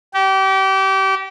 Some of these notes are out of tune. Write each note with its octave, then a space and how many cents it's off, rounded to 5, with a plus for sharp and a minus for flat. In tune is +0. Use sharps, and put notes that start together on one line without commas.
G4 -30